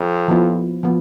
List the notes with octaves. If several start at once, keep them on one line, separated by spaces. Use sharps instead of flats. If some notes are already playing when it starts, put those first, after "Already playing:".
Already playing: F2
F3 B3 E4
F3 B3